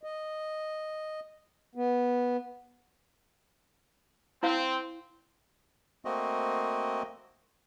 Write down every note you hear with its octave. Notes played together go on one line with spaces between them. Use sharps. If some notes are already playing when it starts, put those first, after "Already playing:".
D#5
B3
C4 E4 C5 F5
A3 A#3 C4 F#4 D#5